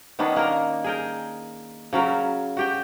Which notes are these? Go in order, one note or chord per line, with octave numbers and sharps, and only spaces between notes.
D#3 B3 C#4 D4
A#3 A#4
G#4 A#4 G5
C#3 F#3 C#4 A#4
F#4 G4 G5